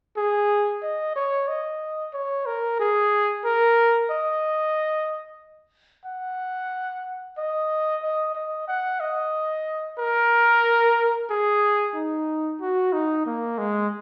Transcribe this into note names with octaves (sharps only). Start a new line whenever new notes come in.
G#4
D#5
C#5
D#5
C#5
A#4
G#4
A#4
D#5
F#5
D#5
D#5
D#5
F#5
D#5
A#4
G#4
D#4
F#4
D#4
A#3
G#3